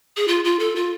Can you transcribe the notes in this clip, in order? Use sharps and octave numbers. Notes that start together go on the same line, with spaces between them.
G#4
F4
F4
A4
F4